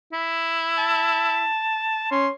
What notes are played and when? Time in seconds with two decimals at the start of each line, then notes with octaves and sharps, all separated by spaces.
0.13 E4
0.78 A5
2.11 C#4 C6